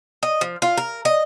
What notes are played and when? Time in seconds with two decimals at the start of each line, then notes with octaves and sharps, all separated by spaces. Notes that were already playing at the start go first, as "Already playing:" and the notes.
0.23 D#5
0.41 F3
0.62 F4
0.77 A#4
1.05 D#5